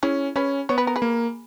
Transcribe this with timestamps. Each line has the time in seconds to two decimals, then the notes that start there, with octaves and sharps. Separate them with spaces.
0.03 C#4 E4 G#4
0.36 C#4 G#4 B4
0.69 B3 C#5
0.78 B4
0.87 A#4
0.96 G#4 B4
1.02 A#3